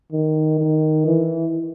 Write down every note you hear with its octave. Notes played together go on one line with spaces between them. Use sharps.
D#3
D#3
E3